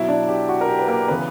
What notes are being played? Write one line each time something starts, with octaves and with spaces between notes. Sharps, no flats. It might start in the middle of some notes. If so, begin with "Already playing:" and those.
Already playing: B2 F#3 E4 E5
D4 D5
G4
F#4
A#4
G4
B4
A#3 A#4
C#3 E3 B3 B4